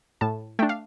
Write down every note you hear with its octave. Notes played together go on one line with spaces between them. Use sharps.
A2 A5
A3 D4 G5
F5